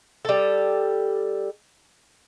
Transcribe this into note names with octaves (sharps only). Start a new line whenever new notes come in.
G3 A4